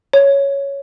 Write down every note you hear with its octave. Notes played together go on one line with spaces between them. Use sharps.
C#5